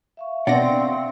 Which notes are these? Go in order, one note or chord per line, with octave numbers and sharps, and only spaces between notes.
E5 F5 C#6
B2 C4 D4 D5 F#5 A#6